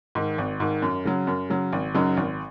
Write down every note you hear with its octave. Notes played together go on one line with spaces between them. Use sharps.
G#2 D#3
G#1
G#2 D#3
F#2
C#3 F#3
F#2
C#3 F#3
G#1
F#2 C#3 F#3 D#4
G#1